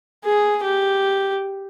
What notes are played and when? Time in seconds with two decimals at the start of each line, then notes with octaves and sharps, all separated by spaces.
0.25 G#4
0.64 G4